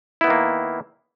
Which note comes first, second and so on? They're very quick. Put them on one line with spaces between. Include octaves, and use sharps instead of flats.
E4 B3 D#3 A#3